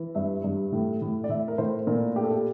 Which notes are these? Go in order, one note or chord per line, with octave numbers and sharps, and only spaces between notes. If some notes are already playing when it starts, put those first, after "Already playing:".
Already playing: E3
G2 E5
G2
A2
A2
D5
A2 E5
A#4
A2 C5
A#2 A#4
A3 G4
A4
G4